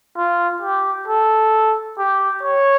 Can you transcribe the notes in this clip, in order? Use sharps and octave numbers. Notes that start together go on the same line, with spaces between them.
F4
G4
A4
G4
C#5